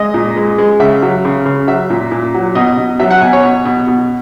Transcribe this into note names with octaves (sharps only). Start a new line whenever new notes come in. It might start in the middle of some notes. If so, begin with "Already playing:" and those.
Already playing: G#3 D#5
A#2
G#3
G#3
C#3 E5
F#3
C#3
C#3
F#3 E5
A#2
A#2
F#3
B2 D#5
B2
F#3 E5
F#5
B2 G#5
C#5
B2
B2
B2